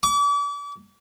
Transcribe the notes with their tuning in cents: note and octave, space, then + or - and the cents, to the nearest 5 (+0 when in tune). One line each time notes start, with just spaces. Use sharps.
D6 -40